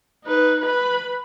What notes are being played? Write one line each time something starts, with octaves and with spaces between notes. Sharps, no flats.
D#4 B4
B4 B5